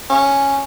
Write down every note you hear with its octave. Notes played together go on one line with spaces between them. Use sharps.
C#4